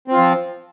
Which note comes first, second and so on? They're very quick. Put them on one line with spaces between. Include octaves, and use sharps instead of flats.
C4 F4 F3